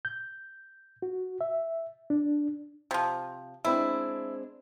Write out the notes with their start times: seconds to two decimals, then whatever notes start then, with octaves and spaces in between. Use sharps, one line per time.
0.05 G6
1.02 F#4
1.41 E5
2.10 D4
2.91 C3 F3
3.65 G#3 C4 D4 E4